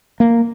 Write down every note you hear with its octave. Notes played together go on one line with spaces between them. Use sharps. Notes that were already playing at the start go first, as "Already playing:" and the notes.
A#3